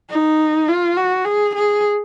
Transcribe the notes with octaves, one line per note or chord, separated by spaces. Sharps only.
D#4
F4
F#4
G#4
G#4